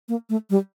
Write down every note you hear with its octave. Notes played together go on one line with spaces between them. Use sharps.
A#3
A3
G3